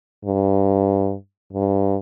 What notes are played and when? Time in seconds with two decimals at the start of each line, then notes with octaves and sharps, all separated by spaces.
0.25 G2
1.53 G2